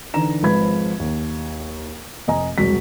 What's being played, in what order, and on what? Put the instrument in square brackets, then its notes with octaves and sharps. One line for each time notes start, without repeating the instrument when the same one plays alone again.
[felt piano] D3 E3 D#4 A#5 E7
G#1 G#2 F3 B4 B5 G#6
D#2
F1 D#5 G#5 A#5
E1 C2 F#3 B6